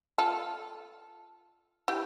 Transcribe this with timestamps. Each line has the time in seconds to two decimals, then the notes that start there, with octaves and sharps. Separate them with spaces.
0.18 F4 A4
1.88 E4 G4